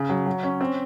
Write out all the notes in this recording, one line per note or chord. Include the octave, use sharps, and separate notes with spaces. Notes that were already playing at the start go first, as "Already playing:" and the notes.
Already playing: C#3
F#3
F#3
C#4
C4